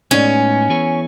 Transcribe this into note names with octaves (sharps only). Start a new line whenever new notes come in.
A2 G#3 B3 C#4 D#4 G#4
E3 B3 E4 G#4 C#5